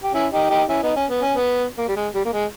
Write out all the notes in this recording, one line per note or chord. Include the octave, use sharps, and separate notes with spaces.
G4
C#4 E4
D#4 G4
D#4 G4
C#4 E4
B3 D#4
C#4
B3
C#4
B3
A#3
G3
G#3
G3
A#3
G#3